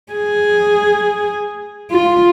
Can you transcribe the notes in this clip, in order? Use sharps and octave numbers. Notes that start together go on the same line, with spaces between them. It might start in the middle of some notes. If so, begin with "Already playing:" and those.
G#4
F4